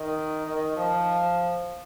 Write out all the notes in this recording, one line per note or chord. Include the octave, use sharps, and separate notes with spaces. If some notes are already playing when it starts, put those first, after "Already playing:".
Already playing: D#3
D#3
F3